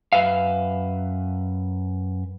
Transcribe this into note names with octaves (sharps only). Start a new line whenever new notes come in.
F#2 B4 E5 F5